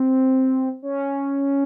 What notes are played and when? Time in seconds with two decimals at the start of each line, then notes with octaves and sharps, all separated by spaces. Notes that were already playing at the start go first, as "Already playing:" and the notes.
Already playing: C4
0.83 C#4